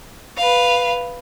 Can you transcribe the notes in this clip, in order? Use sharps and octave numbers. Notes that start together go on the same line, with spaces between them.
B4 F5